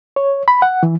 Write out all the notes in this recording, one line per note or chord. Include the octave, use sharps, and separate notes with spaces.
C#5
B5
F#5
E3